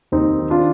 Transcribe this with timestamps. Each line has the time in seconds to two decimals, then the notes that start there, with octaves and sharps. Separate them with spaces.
0.12 D#2 C4 D#4
0.38 D#3
0.50 D4 F4